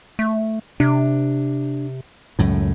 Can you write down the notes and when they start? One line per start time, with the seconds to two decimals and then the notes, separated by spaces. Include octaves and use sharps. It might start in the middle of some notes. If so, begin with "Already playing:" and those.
0.19 A3
0.80 C3 D4
2.39 C#2 F#2 A2